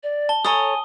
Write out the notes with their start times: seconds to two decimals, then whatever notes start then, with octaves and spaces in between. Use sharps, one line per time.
0.03 D5
0.29 A5 G7
0.45 A4 C#5 G#5 A#5 D#6 G7